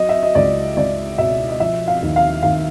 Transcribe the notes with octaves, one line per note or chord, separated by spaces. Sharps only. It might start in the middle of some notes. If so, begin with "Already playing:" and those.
Already playing: F#3 D#5
E5
D#5
C#2 D5
C#2 D5
B2 E5
D#5
F3 E5
F5
D#2
F5
D#2 F5